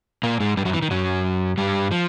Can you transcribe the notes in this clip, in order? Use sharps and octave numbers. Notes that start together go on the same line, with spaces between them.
A#2 A#3
G#2 G#3
G2 G3
F#2 F#3
E3
D#3
F#2 F#3
G2 G3
F3